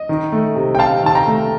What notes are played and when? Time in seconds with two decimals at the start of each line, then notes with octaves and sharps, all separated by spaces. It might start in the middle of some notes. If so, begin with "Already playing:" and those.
Already playing: D#5
0.09 D#3
0.32 A3
0.56 C3
0.75 G5
0.79 C3 F5 A5
1.03 D#3 A5
1.15 G5 A#5
1.27 A3